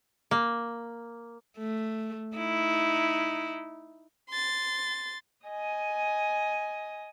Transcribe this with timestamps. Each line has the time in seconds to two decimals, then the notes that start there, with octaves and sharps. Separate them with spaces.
0.31 A#3
1.58 A3
2.36 D#4 E4
4.30 C6 A6
5.46 D#5 G#5